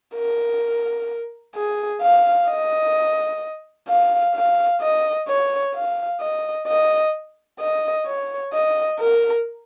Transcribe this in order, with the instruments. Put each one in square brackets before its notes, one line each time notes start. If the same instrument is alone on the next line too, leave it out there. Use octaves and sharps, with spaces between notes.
[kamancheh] A#4
G#4
F5
D#5
F5
F5
D#5
C#5
F5
D#5
D#5
D#5
C#5
D#5
A#4